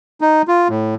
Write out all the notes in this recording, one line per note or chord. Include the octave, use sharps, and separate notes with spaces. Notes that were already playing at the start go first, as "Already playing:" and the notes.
D#4
F4
A2